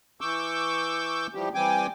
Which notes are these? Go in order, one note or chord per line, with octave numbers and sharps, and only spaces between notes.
E3 C#6 D6 E6 G6
E3 F3 G3 G4
E3 G3 C4 G5 G#5 D6